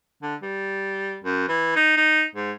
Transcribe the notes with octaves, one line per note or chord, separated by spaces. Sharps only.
D3
G3
F#2
E3
D#4
D#4
G#2